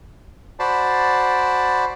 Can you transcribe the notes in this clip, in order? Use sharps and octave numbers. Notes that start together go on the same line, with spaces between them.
F#4 C5 D5 A5 B5